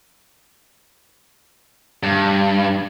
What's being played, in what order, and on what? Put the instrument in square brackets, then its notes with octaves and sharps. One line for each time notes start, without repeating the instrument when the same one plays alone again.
[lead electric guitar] G2